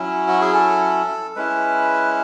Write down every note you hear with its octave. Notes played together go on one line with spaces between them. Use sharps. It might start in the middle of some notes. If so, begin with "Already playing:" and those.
Already playing: F#3 C#4 E4
F#4
G#4
A4
G#3 C#4 E4 B4